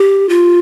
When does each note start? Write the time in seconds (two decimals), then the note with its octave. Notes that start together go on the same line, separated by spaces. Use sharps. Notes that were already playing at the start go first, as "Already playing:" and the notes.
Already playing: G4
0.29 F4